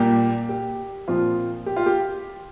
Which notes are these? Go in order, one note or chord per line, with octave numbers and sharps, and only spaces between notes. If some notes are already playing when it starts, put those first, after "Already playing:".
Already playing: A#2 G3 A#3 G4
G4
A#2 F3 C4 F4
G4
F4
G4